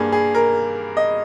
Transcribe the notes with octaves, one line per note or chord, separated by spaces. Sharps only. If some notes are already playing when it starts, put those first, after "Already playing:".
Already playing: G2 G3 A#3 G#4
G#4
A#4
D#5